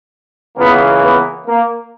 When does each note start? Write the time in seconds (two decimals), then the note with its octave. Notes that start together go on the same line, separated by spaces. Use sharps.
0.57 C#2 C#3 E3 A#3 B3
1.02 B3
1.46 A#3